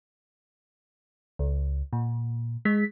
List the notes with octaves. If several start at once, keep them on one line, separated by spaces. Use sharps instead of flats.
C#2
A#2
G#3 B6